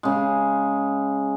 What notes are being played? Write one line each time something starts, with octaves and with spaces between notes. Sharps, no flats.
C#3 G#3